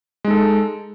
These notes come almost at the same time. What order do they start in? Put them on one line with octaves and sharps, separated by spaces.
G#3 D#4 A4